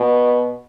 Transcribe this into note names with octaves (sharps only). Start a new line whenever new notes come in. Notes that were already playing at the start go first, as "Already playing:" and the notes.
Already playing: B2